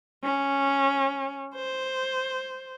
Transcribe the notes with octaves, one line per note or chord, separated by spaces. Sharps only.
C#4
C5